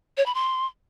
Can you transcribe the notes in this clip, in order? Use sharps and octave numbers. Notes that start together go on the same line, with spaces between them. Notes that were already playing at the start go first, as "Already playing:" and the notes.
C#5
B5
C6